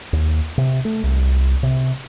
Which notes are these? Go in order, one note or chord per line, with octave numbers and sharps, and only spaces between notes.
D#2
C3
A3
C2
C3